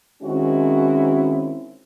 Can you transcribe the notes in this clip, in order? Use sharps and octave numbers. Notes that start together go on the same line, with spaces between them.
D#3 G#3 C4 C#4 E4 F#4